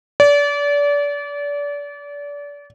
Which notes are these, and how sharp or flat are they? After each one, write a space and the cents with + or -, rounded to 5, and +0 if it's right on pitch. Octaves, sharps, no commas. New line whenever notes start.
D5 -30